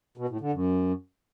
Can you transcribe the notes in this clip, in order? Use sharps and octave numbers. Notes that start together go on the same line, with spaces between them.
B2
A2
D3
F#2